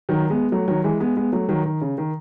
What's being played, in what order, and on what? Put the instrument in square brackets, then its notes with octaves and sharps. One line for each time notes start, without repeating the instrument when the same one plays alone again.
[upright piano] D#3 F#3
G#3 B3
F#3 A3
D#3 F#3
E3 G#3
G#3 B3
G#3 B3
F#3 A3
D#3 F#3
D#3
C#3
D#3